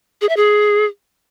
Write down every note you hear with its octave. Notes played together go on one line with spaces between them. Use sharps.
G#4
E5
G#4